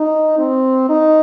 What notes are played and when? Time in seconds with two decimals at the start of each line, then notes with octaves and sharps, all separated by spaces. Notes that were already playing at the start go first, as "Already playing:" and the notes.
Already playing: D#4
0.39 C4
0.89 D#4